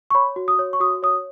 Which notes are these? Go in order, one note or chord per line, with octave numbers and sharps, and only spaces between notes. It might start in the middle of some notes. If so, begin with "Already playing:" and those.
C#6
C#5 B5
F#4
D#6
C#5
C#6
F#4 D#6
C#5 D#6